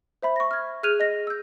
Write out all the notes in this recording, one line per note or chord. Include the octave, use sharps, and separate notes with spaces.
C5 E5 B5
C#6 A#6
F6 G#6
G#4 F6 F#6 G#6 D#7 F7
D#5 A#6
E6 G6